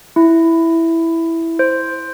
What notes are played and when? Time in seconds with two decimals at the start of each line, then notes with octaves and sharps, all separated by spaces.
0.16 E4
1.59 C5